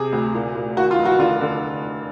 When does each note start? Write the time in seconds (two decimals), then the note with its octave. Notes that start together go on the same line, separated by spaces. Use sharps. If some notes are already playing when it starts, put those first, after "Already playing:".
Already playing: C3 G#4
0.12 D2
0.34 A#2
0.55 A#2
0.76 D#2 F#4
0.91 F4
0.98 F1
1.05 F#4
1.19 D3 F4
1.41 D3